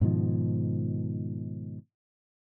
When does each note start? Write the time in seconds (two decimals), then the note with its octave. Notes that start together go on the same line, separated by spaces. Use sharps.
0.01 G#2 B2 D#3 F3